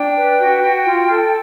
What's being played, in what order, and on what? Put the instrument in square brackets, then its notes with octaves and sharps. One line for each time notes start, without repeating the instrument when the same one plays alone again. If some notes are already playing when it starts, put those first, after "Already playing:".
Already playing: [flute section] D4 G5
B4
F#4
F#4
F4
A4